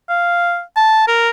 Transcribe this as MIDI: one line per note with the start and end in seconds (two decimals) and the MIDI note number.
0.09 0.61 77
0.76 1.04 81
1.08 1.30 70